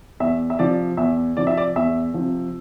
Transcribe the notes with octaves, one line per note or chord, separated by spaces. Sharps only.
E2 E5
E5
C3 F3 D5
E2 E5
C3 F3 D5
E5
D5
E2 E5
C3 F3